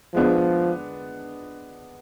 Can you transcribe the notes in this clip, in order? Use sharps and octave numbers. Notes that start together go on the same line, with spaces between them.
F3 G#3 B3 D4